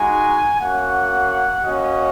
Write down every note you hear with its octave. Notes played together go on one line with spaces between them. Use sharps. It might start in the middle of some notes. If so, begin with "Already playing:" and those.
Already playing: G#3 D#4 F#4 G#5
A#3 C#4 F#4 F#5
A#3 C#4 F#4 D#5